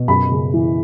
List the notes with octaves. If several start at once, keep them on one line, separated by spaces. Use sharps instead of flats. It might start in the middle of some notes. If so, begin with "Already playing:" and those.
Already playing: B2
F#2 B5
C#3
E3